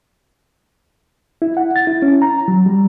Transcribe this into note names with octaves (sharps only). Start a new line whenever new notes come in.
E4
F#5
A6
E4
C#4
A#5
F#3
G3